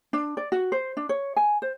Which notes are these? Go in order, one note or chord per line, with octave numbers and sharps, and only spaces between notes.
D4
D5
F#4
C5
D4
C#5
G#5
C5